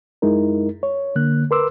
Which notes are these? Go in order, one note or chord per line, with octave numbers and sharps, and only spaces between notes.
F#2 G#3 D#4 E4 A#4
C#5
D3 A#3 F#6
A#4 B4 C6 D6 E6